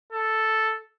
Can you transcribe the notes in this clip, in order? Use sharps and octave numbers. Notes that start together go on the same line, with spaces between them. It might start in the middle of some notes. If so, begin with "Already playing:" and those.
A4